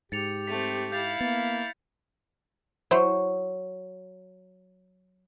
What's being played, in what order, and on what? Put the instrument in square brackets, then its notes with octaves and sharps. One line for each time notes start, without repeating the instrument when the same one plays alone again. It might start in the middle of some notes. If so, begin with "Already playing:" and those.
[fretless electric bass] G#2 [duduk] G4 [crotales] A6 C#7 F7
[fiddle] A3 C4 [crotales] B6
[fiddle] E4 F5 [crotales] G6 A6
[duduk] A#3 [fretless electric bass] B3 [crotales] A6
[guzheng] F#3 [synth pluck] E4 C5